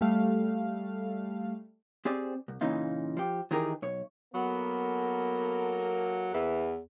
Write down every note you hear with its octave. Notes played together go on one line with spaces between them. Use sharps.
G3 A3 F5
C4 G4 G#4 C5 D5
C2
A#2 C#3 E3 C#4 D#4 F4
F3 G4
D#3 E3 D#4 G4 G#4 A#4
B1 C#5
F#3 A#3 B3 A4 A#4
E2 E3